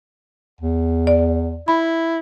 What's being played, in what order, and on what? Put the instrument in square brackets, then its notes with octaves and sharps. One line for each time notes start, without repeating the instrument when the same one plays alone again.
[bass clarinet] E2
[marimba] D5
[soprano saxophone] E4 [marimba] B5